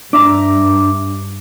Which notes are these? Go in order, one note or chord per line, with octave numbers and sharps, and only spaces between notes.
G2 D4 E5 A#5 D6